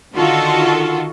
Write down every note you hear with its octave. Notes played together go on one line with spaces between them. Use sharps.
D3 D#3 F4 F#4 A4